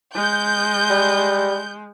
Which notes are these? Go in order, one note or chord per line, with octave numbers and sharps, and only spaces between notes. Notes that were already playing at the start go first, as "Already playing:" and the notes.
G#3 G6
G3